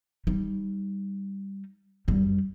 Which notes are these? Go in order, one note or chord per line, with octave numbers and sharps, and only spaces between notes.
G3 D#4
F#2 G3